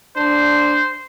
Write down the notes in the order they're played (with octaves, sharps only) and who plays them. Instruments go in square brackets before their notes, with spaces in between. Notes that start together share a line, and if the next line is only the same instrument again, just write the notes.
[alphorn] D4 [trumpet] C5